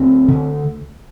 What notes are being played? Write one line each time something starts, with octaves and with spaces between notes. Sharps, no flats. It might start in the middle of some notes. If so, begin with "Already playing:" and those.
Already playing: D2 C4
D3